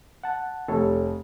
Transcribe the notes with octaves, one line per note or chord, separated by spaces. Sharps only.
F#5 A5
F1 A4 C#5